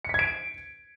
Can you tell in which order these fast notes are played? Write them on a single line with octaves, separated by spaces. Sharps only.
C#7 B6 G#6 D7